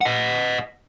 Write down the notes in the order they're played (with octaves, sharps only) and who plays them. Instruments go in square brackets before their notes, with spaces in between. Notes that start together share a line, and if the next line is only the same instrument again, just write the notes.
[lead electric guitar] D#5 F#5